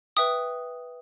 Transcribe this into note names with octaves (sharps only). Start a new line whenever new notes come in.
B4 E5 G5 D#6